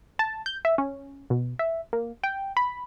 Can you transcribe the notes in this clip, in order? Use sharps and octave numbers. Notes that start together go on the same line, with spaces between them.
A5
G6
E5
C#4
B2
E5
A#3
G5
B5